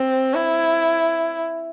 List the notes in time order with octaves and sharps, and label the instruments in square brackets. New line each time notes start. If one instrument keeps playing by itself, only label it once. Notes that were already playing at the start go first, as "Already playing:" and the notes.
Already playing: [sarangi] C4
E4